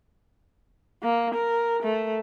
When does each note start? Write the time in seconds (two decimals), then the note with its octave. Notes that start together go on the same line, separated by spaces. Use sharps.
1.03 A#3
1.35 A#4
1.83 A3